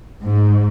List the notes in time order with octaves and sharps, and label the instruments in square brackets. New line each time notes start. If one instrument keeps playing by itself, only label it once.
[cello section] G#2